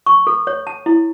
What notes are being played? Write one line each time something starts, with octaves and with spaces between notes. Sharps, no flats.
C#6
A4
C#5
A5
E4